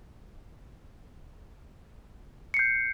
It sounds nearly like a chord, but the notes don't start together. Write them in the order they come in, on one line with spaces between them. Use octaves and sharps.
C#7 C7 G6